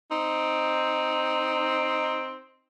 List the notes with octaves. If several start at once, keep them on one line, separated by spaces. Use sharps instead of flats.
C4 D#4